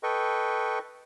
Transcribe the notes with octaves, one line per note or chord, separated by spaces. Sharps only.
A4 B4 D#5 G5 C#6